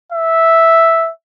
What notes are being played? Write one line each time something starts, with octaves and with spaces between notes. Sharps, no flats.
E5